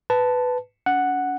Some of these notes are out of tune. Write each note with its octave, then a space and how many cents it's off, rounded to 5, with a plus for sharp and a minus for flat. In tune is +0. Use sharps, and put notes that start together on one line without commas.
B4 +10 A5 +0
C#4 +45 F#5 +0